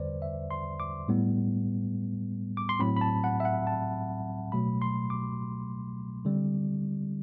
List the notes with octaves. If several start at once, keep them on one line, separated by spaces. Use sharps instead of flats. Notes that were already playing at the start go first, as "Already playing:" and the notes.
Already playing: E2 D3 G3 B4 C5 D5
E5
C6
D6
A2 G3 B3
D6
C6
A2 F#3 C4 B5
B5
A5
F#5
E5
F#5
A5
B2 F#3 A3 B5
C6
D6
D3 G3 C4